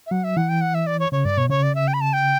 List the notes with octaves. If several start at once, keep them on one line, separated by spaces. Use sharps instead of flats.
E5
F#3 F#5
E5
E3 F#5
G5
F#5
E5
D5
C#5
C#3 C#5
G2 D5
B2 C#5
C#3 C#5
D5
E5
G5
B5
A5
G5